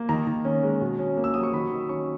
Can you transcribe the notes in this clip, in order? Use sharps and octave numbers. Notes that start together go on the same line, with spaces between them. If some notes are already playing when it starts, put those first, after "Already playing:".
Already playing: A#3
D#3 A#5
D#3
C#4
G#3
B2
C#4
A#3
E6
F#3 D#6
C#6
D#3 B5
D#3
C#4 C#6